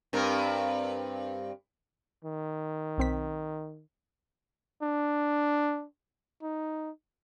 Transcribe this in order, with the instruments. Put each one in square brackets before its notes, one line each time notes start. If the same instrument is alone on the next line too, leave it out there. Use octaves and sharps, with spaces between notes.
[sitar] G2 C4 A#4
[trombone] D#3
[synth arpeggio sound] B1 C4 B6
[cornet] D4
D#4